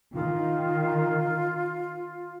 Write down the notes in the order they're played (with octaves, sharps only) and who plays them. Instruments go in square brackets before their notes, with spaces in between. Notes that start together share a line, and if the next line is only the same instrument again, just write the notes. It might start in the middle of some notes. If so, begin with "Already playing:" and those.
[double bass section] D#3 [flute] F4